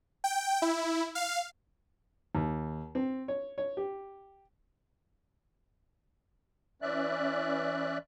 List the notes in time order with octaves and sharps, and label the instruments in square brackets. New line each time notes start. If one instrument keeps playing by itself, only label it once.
[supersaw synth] G5
E4
F5
[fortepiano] D#2
C4
C#5
C#5
G4
[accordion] E3 C#4 D5 E5 F#6